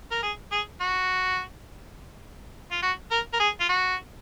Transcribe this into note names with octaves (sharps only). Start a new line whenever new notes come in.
A#4
G#4
G#4
F#4
F4
F#4
A#4
A#4
G#4
F4
F#4